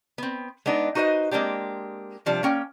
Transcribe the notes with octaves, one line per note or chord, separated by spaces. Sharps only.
B3 C4
G#3 B3 D4 D#4
D#4 F#4 B4 C5 D#5
G#3 A#3 C4 D4 G4
C3 F3 G3 D4
A#3 C#4 G5